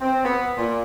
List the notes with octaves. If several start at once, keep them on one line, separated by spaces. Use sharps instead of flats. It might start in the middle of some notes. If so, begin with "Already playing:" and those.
C4
B3
A#2